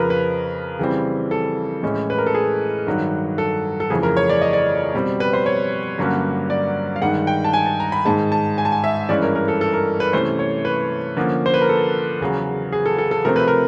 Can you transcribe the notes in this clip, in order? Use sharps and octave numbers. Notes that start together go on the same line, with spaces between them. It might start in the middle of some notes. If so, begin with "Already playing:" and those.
Already playing: F2 C#3 F3 A#4 B4
B4
C#3 E3 G3 C4
A4
A2 E3 G#3 C#4
B4
A#4
A4
G#4
G2 D#3 F#3
A4
A4
F2 C#3 E3 A3 G#4
A#4
C#5
D5
D#5
D5
B2 G3 C4
B4
C5
C#5
G2 D3 F#3 A#3 C#4
D5
F5
G2 D#3 G#3 F#5
G5
A5
G#5
A5
A#5
B5
G#2 D#3 G#3 A5
A5
G#5
A5
G#5
E5
G2 E3 G#3 C#4 D5
A#4
A#4
A4
A4
A#4
B4
C3 E3 A3 C#4 C5
C#5
B4
D3 F3 A#3 C#4
C5
B4
A#4
A4
E2 C#3 F#3
G#4
A4
A4
A4
C3 F3 A3 C4 A#4
B4
A#4